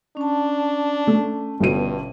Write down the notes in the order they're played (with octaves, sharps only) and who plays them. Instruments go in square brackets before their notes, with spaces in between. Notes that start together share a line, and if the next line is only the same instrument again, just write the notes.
[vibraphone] C#4 A5 [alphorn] D4
[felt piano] A3
[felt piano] G1 B2 D#7 [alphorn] G2